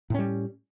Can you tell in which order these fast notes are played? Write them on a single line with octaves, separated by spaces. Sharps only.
A2 C#4 G3